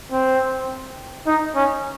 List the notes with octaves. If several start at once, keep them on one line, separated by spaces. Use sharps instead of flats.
C4
D#4
C#4